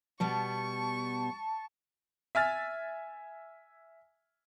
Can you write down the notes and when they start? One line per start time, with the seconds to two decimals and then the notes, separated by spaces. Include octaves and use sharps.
0.20 B2 G3 B3 A5 C#6
2.35 E5 G#5 F6 A6